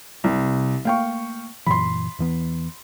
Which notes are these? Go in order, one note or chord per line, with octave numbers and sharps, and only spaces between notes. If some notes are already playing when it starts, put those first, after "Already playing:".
C2 C3
A3 A#3 F5 G5 C#6
F#2 A#2 E3 B5 C6
E2 E3 B3